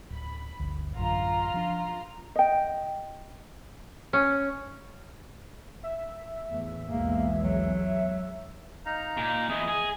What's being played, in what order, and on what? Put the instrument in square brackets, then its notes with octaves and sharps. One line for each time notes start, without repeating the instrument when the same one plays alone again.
[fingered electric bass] D1 [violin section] B5
[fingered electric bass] G1 D2
[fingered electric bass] A1 F#2 D3 [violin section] F4 A#5 F6
[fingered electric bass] F3 D4
[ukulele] D#5 G5
[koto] C#4
[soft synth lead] E5
[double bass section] E2 A2 [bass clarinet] A3
[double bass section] B1 E2 G#3 [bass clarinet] A#3
[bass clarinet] F#3
[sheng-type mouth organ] D#4 F5 A#5
[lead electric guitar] A#2
[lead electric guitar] E2 B3 [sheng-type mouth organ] D#5
[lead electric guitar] G#4